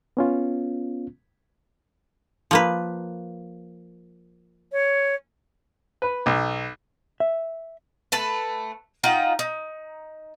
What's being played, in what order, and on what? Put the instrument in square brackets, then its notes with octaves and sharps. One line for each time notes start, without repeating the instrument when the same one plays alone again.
[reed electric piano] B3 C#4 F4
[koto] F3 A#3 B4
[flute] C#5
[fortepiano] B4
B1
[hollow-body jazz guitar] E5
[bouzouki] A3 B4 A5
D#4 F4 F#5 G5
D#4